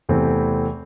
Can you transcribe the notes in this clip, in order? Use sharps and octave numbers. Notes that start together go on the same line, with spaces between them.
E2 C3 E3 A3 C4